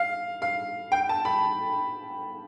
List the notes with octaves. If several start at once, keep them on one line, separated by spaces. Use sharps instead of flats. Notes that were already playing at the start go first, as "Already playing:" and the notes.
Already playing: F5
F5
G5
A5
B5